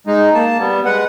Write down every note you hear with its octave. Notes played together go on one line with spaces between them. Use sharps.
G#3 D#4
A#3 A5
G3 B3
G#3 B4 F#5